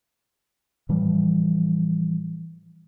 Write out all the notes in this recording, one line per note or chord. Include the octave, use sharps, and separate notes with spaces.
A2 E3 F3 G3